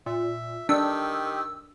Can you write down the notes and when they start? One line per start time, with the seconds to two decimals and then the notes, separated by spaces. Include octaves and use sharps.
0.06 A#2 E5
0.69 D#3 D4 G4 E6